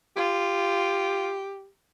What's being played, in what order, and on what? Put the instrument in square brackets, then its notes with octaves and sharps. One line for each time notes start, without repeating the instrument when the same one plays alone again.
[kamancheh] F4 [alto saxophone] G4